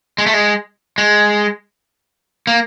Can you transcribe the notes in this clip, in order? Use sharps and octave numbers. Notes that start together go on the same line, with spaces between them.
G#3
A3
G#3
G#3
A#3